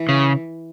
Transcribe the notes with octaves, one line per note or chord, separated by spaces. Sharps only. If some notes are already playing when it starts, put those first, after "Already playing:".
Already playing: E3
C#3